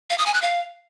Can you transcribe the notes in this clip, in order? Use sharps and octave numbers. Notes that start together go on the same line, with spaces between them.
F5
D#6
G#5
F#6
F5